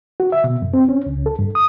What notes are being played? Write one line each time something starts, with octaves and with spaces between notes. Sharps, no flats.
F#4
E5
B2
F#2
C4
C#4
C#2
A4
G2
D#6